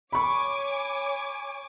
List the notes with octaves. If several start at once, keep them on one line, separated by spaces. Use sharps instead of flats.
C#5 G#5 B5 C#6 D6